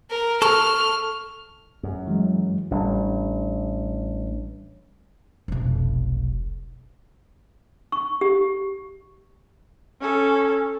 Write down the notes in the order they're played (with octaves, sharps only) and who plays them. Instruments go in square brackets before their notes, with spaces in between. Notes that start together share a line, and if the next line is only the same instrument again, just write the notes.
[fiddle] A#4
[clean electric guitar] A4 [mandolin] C#6 [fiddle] F6
[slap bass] F#2
[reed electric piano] E3 F#3 G#3
[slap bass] A1 [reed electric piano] G3 D4
[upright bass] F1 B1
[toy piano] C#6
G4
[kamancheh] C#4 A4